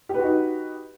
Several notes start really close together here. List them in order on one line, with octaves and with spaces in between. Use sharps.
G4 B4 F#4 D#4